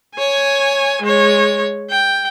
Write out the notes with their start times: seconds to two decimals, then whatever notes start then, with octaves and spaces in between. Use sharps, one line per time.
0.15 C#5 G#5
1.02 G#3 C#5
1.90 G5